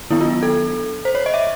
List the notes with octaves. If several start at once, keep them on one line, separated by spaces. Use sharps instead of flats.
D#3 F#3 B3 D4 E4
F4
A4
C5
C#5
D#5
E5